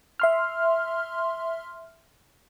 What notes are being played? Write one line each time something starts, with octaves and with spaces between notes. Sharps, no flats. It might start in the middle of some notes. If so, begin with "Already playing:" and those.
E5 C6 F6